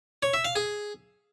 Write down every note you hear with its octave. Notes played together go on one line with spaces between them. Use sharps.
C#5
E5
F5
G#4